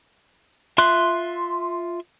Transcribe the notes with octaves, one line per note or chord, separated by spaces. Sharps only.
F4 E5 C6 F#6